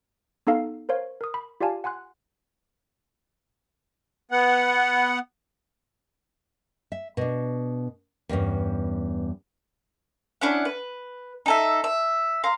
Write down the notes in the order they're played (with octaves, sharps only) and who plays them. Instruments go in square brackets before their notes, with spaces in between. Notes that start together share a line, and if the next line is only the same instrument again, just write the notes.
[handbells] B3 D#4 A4 F5
A#4 C5 C#5 F5
A#4 D#6
B5
F4 G4 D5 F5 G#5 A5
F#5 G#5 C6 F#6
[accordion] B3 F#5
[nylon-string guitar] E5
B2 D4
E2 G2 C#4
[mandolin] C#4 D4 E4 F#5
B4
D#4 A4 E5
E5
F5 A#5 C6